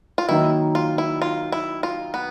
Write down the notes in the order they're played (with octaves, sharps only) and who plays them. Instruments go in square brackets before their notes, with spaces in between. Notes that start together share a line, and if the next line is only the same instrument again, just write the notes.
[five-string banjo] F4
[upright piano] D#3 F#3 A#3 D#4 [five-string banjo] E4
[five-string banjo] F4
E4
F4
E4
F4
B3